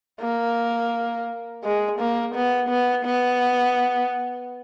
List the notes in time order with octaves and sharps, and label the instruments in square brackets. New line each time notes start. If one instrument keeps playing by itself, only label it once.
[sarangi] A#3
G#3
A#3
B3
B3
B3